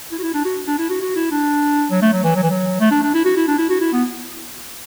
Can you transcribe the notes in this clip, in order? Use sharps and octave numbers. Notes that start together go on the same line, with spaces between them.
E4
F#4
E4
D4
F#4
D4
E4
F#4
F#4
E4
D4
F#3
A3
F#3
E3
F#3
E3
F#3
A3
D4
D4
E4
F#4
E4
D4
E4
F#4
E4
B3